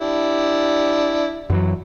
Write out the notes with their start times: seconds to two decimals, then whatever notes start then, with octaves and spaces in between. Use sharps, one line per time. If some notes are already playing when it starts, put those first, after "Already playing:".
0.01 D4 E4 G4
1.50 F#2 E3 F#3